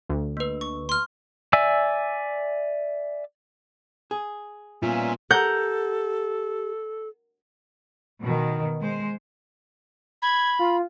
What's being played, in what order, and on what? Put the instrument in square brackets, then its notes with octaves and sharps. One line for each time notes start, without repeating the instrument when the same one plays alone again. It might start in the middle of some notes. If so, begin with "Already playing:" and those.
[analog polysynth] D2
[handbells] A#3 B4
[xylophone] C#6
C6 F6
[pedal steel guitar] D5 E5 G#5 E6
[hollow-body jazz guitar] G#4
[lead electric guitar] A#2 [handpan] G3 B3 F4 [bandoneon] C#4 E5
[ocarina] G4 [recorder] A4 [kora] A#4 F#5 [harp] G6
[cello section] B2 D#3
G#3 C5
[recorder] B5 [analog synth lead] G#6
[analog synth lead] F4